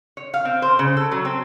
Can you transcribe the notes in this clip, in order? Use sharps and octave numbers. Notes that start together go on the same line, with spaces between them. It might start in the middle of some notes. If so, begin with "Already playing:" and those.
C#5
F5
C4
C5
C#3
A4
F#3
C4